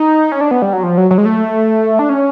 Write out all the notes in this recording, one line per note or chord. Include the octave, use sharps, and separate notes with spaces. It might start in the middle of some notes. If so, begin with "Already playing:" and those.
Already playing: D#4
C#4
D4
B3
G3
F#3
F3
F#3
F#3
G#3
A3
D4
C#4